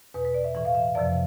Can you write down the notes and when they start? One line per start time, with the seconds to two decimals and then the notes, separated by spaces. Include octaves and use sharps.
0.14 E2 B2 B4
0.25 B4
0.34 D5
0.44 E5
0.55 A2 E3 E5
0.65 F5
0.75 E5
0.95 F2 C3 F3 D5